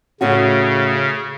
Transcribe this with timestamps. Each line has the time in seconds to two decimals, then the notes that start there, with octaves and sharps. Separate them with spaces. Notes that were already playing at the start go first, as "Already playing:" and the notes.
0.21 A2 C#3 C#4 F#4